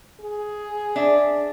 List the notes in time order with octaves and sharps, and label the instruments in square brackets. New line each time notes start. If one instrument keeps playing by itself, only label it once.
[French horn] G#4
[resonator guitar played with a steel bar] D4 E5